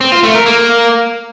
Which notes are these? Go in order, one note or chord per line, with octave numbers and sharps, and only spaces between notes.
C4
F4
A3
A#4
A#3